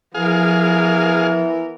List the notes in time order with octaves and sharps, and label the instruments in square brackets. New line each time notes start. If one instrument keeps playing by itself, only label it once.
[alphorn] E3 [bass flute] F3 [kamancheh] B3 A#4 [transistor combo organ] G#4 F5